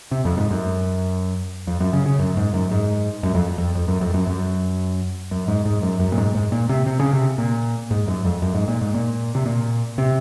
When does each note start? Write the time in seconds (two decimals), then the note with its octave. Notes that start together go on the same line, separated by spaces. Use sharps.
0.11 C3
0.25 F2
0.37 G#2
0.50 F#2
1.67 F2
1.80 F#2
1.93 C#3
2.06 C#3
2.19 F#2
2.37 G#2
2.54 F#2
2.71 G#2
3.23 F#2
3.34 F2
3.58 F2
3.75 F2
3.88 F#2
4.01 F2
4.14 F#2
4.27 F#2
5.31 F#2
5.48 G#2
5.65 G#2
5.83 F#2
6.00 F#2
6.12 A#2
6.18 G#2
6.35 G#2
6.52 A#2
6.69 C3
6.86 C3
6.99 C#3
7.13 C3
7.38 A#2
7.91 G#2
8.08 F#2
8.24 F2
8.42 F#2
8.55 G#2
8.68 A#2
8.81 G#2
8.94 A#2
9.35 C3
9.46 A#2
9.98 C3